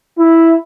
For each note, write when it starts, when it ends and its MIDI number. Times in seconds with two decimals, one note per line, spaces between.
0.18 0.54 64